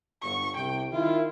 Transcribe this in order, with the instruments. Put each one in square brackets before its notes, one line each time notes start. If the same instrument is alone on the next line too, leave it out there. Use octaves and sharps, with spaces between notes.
[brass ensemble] G1 [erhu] C#6
[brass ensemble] C2 [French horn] C3 [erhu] G5
[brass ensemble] D#3 [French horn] E4 [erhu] F4